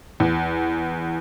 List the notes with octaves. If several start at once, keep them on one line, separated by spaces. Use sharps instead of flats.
E2